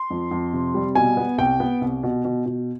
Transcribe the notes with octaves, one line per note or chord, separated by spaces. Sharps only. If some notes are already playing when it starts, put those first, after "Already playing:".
Already playing: C6
F2
F2
C3
G3
B2 G#5
B3
C2 G5
B3
C2
B2
B2
B2